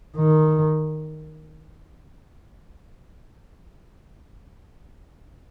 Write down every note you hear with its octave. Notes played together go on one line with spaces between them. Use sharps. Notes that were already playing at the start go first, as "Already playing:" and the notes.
D#3